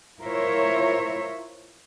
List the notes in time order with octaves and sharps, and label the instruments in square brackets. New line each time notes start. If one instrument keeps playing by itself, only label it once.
[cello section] E4 F4 A#4 C5 C#5 E5